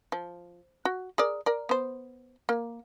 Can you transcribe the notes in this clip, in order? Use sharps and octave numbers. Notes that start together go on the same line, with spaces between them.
F3
F#4
G#4 A#4 D5
A#4 D5
B3 C5
A#3